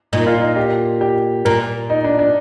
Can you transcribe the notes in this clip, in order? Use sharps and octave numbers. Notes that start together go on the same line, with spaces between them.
A#2 D#4
F4
D#4
G4
G4
A#2 A#4
D#4
D4
D4